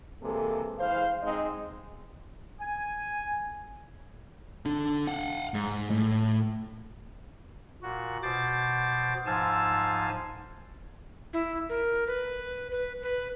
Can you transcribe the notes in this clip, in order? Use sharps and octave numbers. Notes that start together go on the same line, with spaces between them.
C3 E3 G#3 A#3 A4
E3 G#3 C5 F5
G#3 C4 D#4 D#5
G#5
D4 A4
F5 F#5
G#2
A2
A#2 F#4
B2 C5 D6 A6
G#2 F3 F5 G#5 A5 E6
E4
A#4
B4
B4
B4